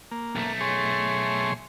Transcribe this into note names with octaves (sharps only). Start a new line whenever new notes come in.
A#3
B1 A3
G#4 C#5 C6